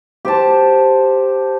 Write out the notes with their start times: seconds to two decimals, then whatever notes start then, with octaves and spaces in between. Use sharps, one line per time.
0.25 G4 C5 A5